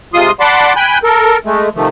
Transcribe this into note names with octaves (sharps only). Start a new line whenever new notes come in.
C3 G#3 F4 C6 D#6
D5 F#5 A5 B5 C6 D6
G5 G#5 B5 F#6 G6
A4 A#4
G#3 A3
C3 D#3 F3 A3